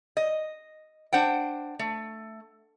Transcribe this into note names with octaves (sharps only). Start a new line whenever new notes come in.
D#5
D4 C5 F#5 G5
A3